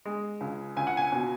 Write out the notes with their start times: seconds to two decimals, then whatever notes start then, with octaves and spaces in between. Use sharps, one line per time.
0.05 G#3
0.41 C#2
0.77 C#2 G#5
0.87 F#5
0.97 G#5
1.12 B2